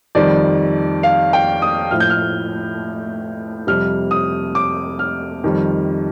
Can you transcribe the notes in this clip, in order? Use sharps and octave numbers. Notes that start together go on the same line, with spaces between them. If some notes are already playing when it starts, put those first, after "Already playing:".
F2 D#3 G3 D5
F5
G5
D#6
A2 F3 F6
G6
F6
F2 C3 G3 F6
D#6
D6
F6
F2 D#3 G3